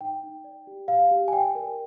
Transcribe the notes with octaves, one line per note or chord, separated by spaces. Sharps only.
D#4 G5
D#4
D5
G4
G4 F5
G4
G#5
D5 G5
A#4